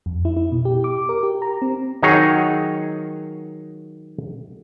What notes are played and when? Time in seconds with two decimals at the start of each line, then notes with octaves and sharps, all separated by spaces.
0.06 F2
0.25 E4
0.37 E4
0.52 B2
0.65 G4
0.84 D6
1.09 A#4
1.23 G4
1.42 A#5
1.62 C4
2.03 D#3 F#3 D#4 G#4 C#5